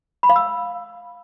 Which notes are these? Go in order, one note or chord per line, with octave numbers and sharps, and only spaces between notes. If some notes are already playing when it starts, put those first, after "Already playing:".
B5
F5
E6